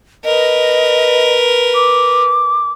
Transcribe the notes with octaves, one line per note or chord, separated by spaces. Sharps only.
A#4 B4 D#5
D6